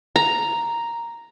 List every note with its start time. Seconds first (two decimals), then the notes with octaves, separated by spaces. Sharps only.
0.16 A#5